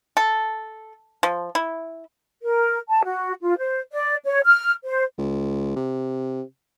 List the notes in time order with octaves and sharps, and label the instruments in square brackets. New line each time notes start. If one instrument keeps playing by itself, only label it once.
[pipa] A4
F3
E4
[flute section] A#4
A5
F#4
F4
C5
D5
C#5
F6
C5
[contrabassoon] C#2
C3